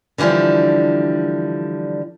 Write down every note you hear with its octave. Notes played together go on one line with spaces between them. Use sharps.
D3 E3 F3 G3 D4